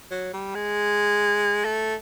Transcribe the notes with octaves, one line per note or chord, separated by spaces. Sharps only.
F#3
G3
G#3
A3